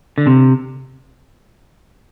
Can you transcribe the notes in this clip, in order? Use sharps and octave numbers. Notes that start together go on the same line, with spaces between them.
D3
C3